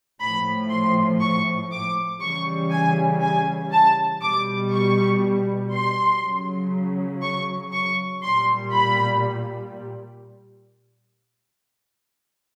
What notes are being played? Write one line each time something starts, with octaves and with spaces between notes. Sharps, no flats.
A2 F3 B5
C6
C#6
D6
C#3 E3 G3 C#6
G#5
G#5
A5
B2 G3 D6
C#6
C6
C#3 F#3
C#6
C#6
A#2 G3 C6
B5